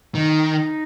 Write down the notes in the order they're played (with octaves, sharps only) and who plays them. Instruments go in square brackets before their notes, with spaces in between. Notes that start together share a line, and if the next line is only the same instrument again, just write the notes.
[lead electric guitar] D#3 [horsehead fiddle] D#4